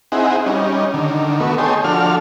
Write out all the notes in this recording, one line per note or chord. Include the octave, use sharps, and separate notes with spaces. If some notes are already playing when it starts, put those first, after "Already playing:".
C4 D#4 E4 G#4 F#5
G3 C#4 D#4
D3 D#3
A3 B3 F#4
G#4 C#5 D#5 G5 A5 C6
F3 D4 F#4 A4 F6